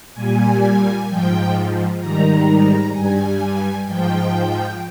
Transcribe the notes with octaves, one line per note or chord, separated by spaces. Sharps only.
A#2 G3 G#5
G#2 F3 G5
G#2 D#3 G3 A#5
G2 G3 G#5
G#2 F3 G5